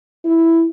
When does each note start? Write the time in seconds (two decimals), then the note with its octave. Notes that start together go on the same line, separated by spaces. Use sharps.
0.25 E4